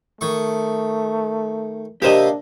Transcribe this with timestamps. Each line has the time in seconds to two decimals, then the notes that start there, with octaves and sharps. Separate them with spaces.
0.21 D#3 A3 C#6
2.02 C3 A#3 D4 G4 C5 D#5